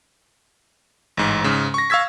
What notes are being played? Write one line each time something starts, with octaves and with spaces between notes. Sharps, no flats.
A1 G#2
G#2 C#3
C#6 A#6
F5 C#6 E6 G#6 B6